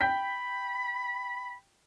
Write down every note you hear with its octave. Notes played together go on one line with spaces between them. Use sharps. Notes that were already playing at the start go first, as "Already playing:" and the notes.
G5 B5 G6 B6